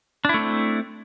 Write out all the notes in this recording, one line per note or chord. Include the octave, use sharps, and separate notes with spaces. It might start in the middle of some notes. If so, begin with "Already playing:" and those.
A3 C4 D4 E4